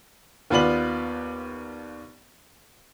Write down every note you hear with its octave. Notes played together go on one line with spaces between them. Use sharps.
D#2 B3 F4 B4 D5 F#7